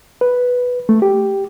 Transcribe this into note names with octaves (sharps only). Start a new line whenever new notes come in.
B4
A3
G4